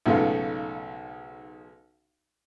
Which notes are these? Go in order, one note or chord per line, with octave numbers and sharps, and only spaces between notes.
B1 G#2 C#3 A3 F4